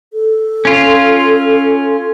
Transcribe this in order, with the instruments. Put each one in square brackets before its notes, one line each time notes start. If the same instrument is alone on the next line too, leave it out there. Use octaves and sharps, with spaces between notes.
[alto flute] A4
[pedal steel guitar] C#4 F4